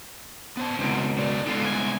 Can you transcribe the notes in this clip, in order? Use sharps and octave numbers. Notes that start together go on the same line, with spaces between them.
B3 C5 A5
C#2 B2 C4 D#4 E4
C4 F#4 D5
D3 G#3 B3 D#4 F4
C2 G#5